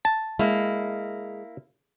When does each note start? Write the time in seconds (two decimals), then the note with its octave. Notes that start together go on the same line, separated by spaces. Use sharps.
0.05 A5
0.39 G#3 A#3 E4